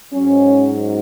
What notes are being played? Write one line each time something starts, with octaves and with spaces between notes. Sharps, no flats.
G#2 F#3 C#4